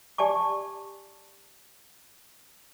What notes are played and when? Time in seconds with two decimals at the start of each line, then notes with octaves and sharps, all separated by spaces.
0.18 G4 D5 G#5 A5 D6